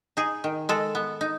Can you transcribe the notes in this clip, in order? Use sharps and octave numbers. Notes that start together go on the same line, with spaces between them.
D#4 G#4
D#3
G#3 A4
B3
D#4